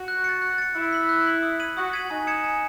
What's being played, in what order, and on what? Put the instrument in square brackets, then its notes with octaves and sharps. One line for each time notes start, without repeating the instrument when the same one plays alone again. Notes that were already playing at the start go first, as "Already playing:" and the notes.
Already playing: [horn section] F#4
[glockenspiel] F#6
A6 C#7
F#6
A6 C#7
[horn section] E4 [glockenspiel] F#6
[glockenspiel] B6 F#7
F#6
B6 F#7
D#6
G#6 B6 D#7 F#7
[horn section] F#4 [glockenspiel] D#6
[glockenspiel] G#6 B6 D#7 F#7
[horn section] D#4 [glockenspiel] G#5
[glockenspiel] D#6 G#6 C#7 E7
G#5